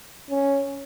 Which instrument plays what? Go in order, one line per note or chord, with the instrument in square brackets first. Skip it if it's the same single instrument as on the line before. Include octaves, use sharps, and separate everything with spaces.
[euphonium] C#4